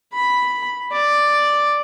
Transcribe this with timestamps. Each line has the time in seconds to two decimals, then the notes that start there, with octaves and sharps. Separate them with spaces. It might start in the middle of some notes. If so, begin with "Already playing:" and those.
0.13 B5
0.92 D5